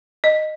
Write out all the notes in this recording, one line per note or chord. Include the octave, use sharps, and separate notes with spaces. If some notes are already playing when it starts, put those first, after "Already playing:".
D#5